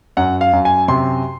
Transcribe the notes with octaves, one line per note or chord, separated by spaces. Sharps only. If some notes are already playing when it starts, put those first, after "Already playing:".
F#2 F#5
F5
F#2
G#5
C3 C6